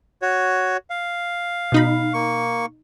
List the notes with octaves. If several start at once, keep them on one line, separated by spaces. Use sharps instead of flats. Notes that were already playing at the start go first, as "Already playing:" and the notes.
F#4 C#5
F5
B2 D#4 B5
A#3 C#6